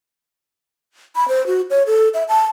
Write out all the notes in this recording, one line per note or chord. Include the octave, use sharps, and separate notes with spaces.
B5
C5
F#4
C#5
A4
E5
A5